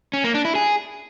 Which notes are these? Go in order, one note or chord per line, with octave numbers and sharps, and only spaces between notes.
C#4
A#3
D4
E4
G#4